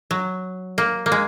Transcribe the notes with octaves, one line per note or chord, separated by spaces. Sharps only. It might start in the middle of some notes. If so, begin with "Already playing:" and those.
F#3
A#3
A#3
G#3